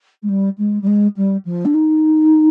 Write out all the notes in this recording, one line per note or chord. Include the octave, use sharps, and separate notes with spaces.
G#3
G3
G#3
G3
G#3
G3
F3
D4
D#4